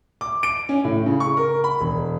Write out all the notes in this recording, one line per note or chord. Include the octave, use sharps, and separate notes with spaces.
D6
D7
C#4
A2
C#3
C#6
A#4
B5
E1